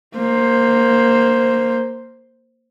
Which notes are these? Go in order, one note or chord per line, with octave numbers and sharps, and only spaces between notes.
A#3 C5